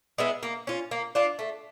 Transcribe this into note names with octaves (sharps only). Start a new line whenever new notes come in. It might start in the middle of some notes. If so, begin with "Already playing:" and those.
G#3 B3 E4
A#3
C#4 F4
A#3
D4 F4
A3